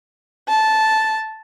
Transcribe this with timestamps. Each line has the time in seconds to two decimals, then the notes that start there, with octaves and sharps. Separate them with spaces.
0.49 A5